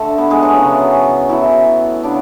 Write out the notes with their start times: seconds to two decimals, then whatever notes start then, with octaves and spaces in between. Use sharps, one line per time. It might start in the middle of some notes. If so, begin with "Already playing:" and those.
Already playing: D3 A3 A4
0.18 B3 B4
0.30 G#3 G#4
0.43 F#3 F#4
0.55 C#3 E3 B3
1.29 A2 E3 F#3 B3 E4
2.03 C#3 F#3 B3 D4